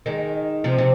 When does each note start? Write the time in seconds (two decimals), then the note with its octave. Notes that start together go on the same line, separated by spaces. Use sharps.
0.06 D#3 G#3
0.64 C3 F3
0.78 C3